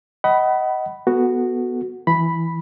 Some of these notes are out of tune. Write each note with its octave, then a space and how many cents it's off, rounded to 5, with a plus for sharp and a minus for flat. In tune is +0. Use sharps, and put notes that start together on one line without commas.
D#5 +15 F#5 +30 B5 +0
B3 -5 F#4 +0 A4 +0
E3 +0 B5 +0